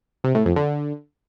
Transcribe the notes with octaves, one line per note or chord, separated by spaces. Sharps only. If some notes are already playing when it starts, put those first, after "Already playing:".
C3
A2
F2
D3